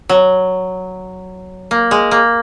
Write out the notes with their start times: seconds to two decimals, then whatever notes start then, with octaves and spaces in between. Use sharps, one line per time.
0.09 F#3
1.71 A#3
1.91 G#3
2.11 A#3